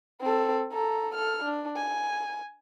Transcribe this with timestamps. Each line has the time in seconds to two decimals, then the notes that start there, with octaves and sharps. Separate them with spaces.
0.21 C4 A4
0.73 A4 A#5
1.15 A4 F6
1.44 D4
1.76 G#5